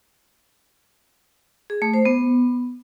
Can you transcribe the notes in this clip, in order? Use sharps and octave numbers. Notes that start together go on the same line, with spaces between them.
G#4
A3
C5
B3